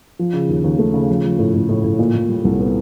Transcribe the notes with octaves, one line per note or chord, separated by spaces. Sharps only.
F3
C#3
D#2
D#2
A3
C#3
F3
F3
A2
A2
A2
A2
A#2
A#2
G3
C2
B3